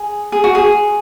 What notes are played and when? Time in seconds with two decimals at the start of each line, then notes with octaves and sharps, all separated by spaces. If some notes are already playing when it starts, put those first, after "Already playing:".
Already playing: G#4
0.32 G#4
0.44 F#4
0.55 G#4